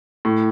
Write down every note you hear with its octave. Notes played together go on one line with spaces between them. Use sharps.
A2